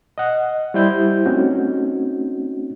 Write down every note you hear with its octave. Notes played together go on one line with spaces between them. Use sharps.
D#5 F#5
G3 E4 C5 G6
A3 C4 C#4 D#4 F#4